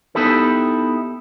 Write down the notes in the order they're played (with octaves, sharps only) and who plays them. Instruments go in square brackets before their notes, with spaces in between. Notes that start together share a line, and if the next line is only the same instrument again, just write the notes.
[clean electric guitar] B3 D#4 E4 G4 A4